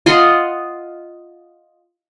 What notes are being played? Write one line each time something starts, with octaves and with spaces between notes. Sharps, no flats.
F4 D#5 F#5 C6